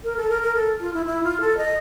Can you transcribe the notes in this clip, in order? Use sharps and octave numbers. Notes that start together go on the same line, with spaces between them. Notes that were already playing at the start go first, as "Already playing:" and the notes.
A#4
A4
A#4
A#4
A4
F4
E4
E4
F4
A4
D#5